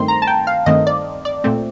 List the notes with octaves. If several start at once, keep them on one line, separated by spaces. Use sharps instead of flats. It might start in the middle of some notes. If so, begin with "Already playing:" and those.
Already playing: G2 D#3 A3 C4 C6
A#5
A5
G5
F5
G2 D#3 A3 C4 D#5
D5
D5
A#2 A3 C4